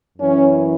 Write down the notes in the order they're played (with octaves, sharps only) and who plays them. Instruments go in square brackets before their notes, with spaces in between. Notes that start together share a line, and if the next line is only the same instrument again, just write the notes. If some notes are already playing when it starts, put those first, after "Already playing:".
[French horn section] F#2 E3 C#4